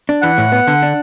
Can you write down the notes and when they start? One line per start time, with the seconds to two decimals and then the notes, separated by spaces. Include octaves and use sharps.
0.09 D4
0.23 E3 F#5
0.38 A2
0.52 B3
0.67 D3
0.83 D4